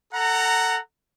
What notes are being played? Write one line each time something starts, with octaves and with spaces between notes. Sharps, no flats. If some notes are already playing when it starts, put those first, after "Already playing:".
A4 F#5 A#5